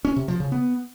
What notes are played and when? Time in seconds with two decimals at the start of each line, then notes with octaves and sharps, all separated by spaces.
0.05 C#4
0.16 C3
0.28 F3
0.40 C#3
0.52 B3